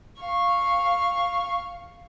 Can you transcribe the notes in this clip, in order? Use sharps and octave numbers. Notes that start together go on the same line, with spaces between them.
F5 C#6